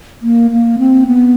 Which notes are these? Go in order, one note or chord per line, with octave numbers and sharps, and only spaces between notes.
A#3
A#3
C4
B3